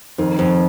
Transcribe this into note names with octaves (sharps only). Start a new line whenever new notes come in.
F2 D#3
F2